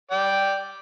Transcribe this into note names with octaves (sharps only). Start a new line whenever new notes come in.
D5 G5